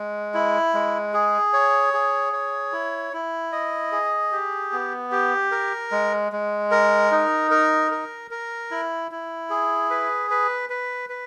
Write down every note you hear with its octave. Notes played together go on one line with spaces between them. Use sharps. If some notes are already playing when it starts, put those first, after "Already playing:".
Already playing: G#3
E4
G#3
G#4
C#5
G#4
C#5
E4
E4
D#5
G#4
G4
B3
G4
A#4
G#3
G#3
A#4
D#4
A#4
A#4
A#4
E4
E4
G#4
B4
B4
B4
B4